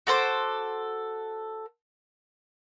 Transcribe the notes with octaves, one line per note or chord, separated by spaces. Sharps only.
F#4 A4 C5 D6